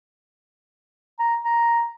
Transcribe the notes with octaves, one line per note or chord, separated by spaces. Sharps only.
A#5
A#5